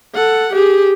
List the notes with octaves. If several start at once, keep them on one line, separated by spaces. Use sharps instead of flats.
A4 F#5
G4 G#4